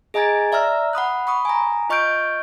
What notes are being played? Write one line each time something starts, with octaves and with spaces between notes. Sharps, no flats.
G#4 D#5 G#5 A#5 G#6 A6
D5 E5 A#5 E6 F6
F#5 B5 D#6 F#6
B5 C#6 D#6
G#5 A#5
F4 D#5 C#6 F6 G6 D7